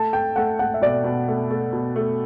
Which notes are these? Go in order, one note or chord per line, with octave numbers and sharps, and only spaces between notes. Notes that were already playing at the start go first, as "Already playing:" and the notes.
Already playing: A3 A5
A3 G5
A3 F#5
A3 F#5
E5
B2 D5
B2
A3
A3
B2
A3